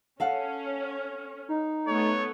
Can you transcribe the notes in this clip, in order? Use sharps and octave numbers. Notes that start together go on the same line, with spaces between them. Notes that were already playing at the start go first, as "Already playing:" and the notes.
C#4 A4 F5 F#5
D#4
A3 B3 C#5